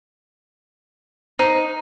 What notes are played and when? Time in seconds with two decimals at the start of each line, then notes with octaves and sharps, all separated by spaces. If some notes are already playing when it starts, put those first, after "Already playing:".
1.39 D#4 C5